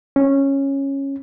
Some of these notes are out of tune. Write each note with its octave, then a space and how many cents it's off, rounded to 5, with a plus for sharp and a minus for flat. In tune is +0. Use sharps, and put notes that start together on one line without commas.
C#4 -10